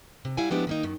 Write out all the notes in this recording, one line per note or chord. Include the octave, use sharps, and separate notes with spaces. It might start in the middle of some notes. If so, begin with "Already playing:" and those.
C3
G3 E4 F5 F#5 G#5
F3 G#3 B3 D4 E4 G4
D#3 A#3 D#4
F#2 D#3